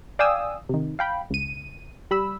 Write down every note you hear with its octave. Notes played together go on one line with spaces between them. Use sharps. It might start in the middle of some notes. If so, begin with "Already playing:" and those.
D5 F5 G5 G#5 D#6 E6
C3 D#3
F5 G5 B5
C#2 D#7
G3 B5 E6